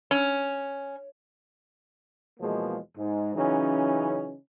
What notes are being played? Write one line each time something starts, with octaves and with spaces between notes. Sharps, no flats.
C#4
E2 B2 F3 G#3 A#3
G#2
C#3 E3 F#3 C#4 D#4